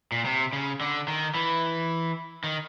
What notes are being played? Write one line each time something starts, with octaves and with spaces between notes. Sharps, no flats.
A#2
C3
C#3
D3
D#3
E3
D#3